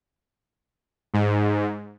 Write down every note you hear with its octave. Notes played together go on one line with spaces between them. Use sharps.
G#2